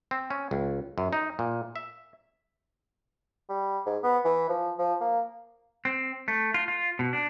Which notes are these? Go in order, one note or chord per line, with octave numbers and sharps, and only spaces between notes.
C4
C#4
C#2
F#2
D#4
A#2
E5
G3
G#2
B3
E3
F3
F3
A#3
C4
A3
F4
F4
B2
D4